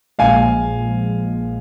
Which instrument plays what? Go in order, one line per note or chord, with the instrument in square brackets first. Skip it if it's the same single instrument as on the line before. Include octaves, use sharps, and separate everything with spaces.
[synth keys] A#1 A#2 F3 G#3 [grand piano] F5 G#5